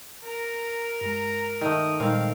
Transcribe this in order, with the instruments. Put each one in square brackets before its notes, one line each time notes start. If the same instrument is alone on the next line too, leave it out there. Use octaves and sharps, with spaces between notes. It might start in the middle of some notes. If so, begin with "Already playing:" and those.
[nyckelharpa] A#4 [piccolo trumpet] A#5
[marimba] G2 G#3 [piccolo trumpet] A#5
[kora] D#3 A3 [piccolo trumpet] D#6
[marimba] A#2 G3 G#3 [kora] D#3 C4 [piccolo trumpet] F5